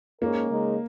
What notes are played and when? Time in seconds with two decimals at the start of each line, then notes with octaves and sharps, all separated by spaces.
0.21 G#2 G#3 A#3 C#4 A#4
0.50 C#3 G#3 D#4 A#4